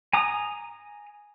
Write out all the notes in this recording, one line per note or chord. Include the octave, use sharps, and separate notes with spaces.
G#5 A#5 D#6